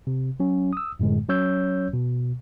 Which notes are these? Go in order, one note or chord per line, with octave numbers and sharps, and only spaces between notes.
C3
F#3 C#4
D#6 E6
F#2 A2 D3 G#3
F#3 C#4 C#5 E6 G6
B2